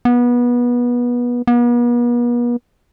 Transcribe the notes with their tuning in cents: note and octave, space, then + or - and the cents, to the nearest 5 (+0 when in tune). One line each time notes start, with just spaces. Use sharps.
B3 -25
B3 -45